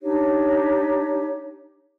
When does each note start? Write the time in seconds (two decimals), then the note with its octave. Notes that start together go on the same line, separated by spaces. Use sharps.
0.02 D4 D#4 G4 C#5